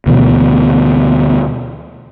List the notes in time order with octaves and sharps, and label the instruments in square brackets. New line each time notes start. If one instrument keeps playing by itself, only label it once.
[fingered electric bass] D2 B2 E3